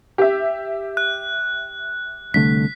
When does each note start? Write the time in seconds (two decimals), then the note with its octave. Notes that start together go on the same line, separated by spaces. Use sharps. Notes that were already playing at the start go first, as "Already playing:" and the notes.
0.18 G4 E5
0.97 F#6
2.34 C2 D3 A3 B6